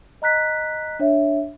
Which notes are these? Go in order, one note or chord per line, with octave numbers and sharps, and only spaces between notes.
D#5 A#5 F#6 B6
D4 C#5 E5